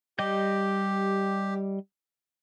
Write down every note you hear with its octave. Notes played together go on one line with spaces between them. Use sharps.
G3 G4 D#5 G6